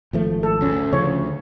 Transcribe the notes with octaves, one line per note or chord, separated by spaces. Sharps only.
G#1 F3 A3
A4
D2 C#4
C#3 F3 C#5